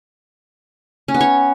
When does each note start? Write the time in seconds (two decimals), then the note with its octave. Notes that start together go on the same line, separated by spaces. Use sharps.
1.08 C#4
1.14 B3
1.21 C#5